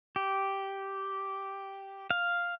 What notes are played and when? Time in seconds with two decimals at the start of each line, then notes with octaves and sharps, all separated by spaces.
0.16 G4
2.11 F5